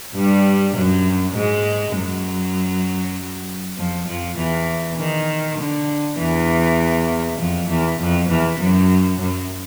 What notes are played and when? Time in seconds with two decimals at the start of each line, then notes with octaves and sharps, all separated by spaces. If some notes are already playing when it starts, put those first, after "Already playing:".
0.15 G2 G3
0.75 F#2 F#3
1.36 G#2 G#3
1.96 F#2 F#3
3.77 F2 F3
4.08 F2 F3
4.38 E2 E3
4.98 D#3
5.58 D3
6.18 E2 E3
7.39 F2 F3
7.69 E2 E3
8.00 F2 F3
8.30 E2 E3
8.60 F#2 F#3
9.20 F#2 F#3